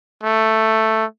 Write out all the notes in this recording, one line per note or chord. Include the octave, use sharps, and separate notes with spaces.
A3